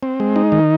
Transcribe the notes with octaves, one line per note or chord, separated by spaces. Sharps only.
C4
G#3
D#4
D#3